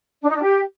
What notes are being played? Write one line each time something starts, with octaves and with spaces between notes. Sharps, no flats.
D4
D#4
D4
G4